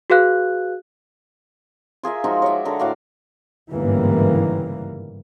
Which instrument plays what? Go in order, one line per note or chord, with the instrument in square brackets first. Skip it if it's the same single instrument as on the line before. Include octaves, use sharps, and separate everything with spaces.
[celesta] F#4 G#4 B4 F5 F#6
[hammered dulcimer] F4 G#4 A#4 E5
F3 G#3 D#4 F#4
C#5 D5 E5
D3 A4 A#4
A2 F#4 D5 F5
[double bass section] G1 G#2 C#3 E3 G3 A#3